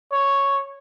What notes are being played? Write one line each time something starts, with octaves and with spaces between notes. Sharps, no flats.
C#5